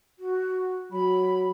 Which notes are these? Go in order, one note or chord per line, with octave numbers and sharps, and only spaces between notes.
F#4
F#3 B5